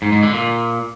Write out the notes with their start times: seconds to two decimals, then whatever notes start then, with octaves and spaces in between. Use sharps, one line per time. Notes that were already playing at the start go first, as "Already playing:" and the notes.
0.02 G#2
0.12 G#2
0.23 D3
0.33 A#2